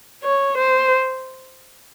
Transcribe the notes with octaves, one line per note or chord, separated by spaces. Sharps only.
C#5
C5